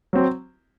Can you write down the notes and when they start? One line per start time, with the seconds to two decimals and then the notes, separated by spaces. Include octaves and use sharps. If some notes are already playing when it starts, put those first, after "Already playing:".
0.13 F#3 C4